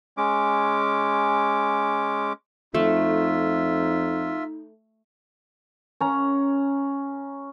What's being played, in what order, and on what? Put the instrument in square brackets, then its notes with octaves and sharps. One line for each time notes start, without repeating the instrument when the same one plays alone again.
[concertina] G#3 C#4 D6
[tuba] F2 [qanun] A3 [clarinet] D#4 [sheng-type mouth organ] F4 E5
[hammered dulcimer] C#4 A#5